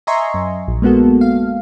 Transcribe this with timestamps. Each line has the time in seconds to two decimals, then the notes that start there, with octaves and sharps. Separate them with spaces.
0.07 D#5 E5 G#5 A#5 C6 C#6
0.34 F#2
0.68 A#1
0.82 G#3 A#3 B3 F#4 A4
1.21 F5